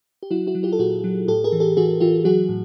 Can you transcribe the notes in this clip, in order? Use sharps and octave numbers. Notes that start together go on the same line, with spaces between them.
G4
F#3 E4 F#4
E4 F#4
F#3
F4 G4
A4
A#2 F#4 G#4
F#3
A2 G4 A4
G#4 A#4
E3
G4 A4
E3 F#4 G#4
E3 F4 G4
F#3 F#4 G#4
A2